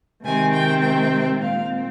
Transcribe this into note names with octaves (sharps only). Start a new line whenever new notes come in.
C3 D#3 G#3 C4 G#5
G5
G5
A#2 G#3 C4 F5